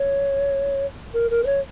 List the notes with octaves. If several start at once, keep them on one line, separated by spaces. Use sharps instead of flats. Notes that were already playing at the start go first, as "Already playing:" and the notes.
Already playing: C#5
A#4
A#4
B4
C#5